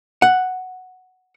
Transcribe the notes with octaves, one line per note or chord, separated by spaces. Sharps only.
F#5